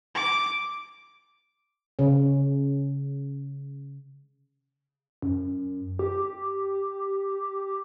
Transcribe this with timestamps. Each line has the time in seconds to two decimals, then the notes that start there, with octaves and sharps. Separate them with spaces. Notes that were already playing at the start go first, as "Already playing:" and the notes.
0.15 D6
1.99 C#3 C#4
5.22 F#2
5.99 G4